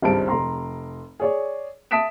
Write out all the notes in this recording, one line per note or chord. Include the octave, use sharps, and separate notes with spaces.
G#1 C#2 G2 C5 A5 D7
F1 A#5 C6
G#4 C#5 D5
E5 A5 D#6 B6 D7 E7